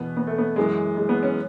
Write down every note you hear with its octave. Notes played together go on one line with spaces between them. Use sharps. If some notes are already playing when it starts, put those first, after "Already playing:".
Already playing: E2 B2 B3
B3
A3
B3
F#2 E3 G#3
G#3
B3
C#4